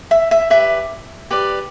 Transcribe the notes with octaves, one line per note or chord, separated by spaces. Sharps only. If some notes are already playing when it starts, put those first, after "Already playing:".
E5
E5
G4 B4 D5 E5
G4 B4 D5